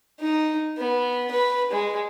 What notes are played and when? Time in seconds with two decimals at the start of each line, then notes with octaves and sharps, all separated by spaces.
0.20 D#4
0.78 B3
1.31 B4
1.70 G#3